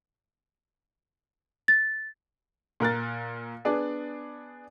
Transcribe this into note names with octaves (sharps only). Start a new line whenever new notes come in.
A6
A#2 A#4 F#6 A6
B3 D4 G#4 D5